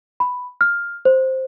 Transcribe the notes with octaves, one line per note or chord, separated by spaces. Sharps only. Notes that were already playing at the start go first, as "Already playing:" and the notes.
B5
F6
C5